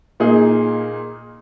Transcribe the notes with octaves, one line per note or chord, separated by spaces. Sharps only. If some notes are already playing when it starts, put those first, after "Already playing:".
A#2 A#3 D#4 G#4